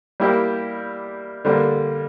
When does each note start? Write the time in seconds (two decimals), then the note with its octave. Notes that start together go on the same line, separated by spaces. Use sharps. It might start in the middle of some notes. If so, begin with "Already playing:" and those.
0.20 G3 A#3 E4 G4
1.45 D3 G3 A#3